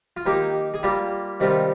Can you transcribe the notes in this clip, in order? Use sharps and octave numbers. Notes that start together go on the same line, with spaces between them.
F4
D#3 A#3 D#4 G4
G#4
G3 A#3 F4 G4
C3 D#3 G3 C4 F4